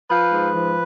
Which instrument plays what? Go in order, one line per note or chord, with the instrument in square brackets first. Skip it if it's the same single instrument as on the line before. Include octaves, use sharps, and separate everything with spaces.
[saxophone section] F3 B4
G#2
F3